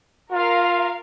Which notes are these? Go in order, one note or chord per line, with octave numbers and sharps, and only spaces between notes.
F4 A#4 F5